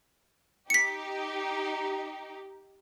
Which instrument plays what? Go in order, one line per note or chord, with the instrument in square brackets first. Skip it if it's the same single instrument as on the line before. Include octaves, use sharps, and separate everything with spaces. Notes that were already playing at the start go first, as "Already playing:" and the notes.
[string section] D#4 G4 [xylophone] B6 C#7